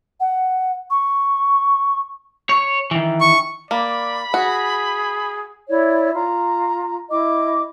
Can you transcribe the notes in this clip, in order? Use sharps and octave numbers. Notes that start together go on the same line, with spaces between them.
F#5
C#6
C#5
D#3 E3
C#6
A#3 D5 B5
F#4 G#4
E4 C#5 D5
F4 A#5
E4 D#5 D6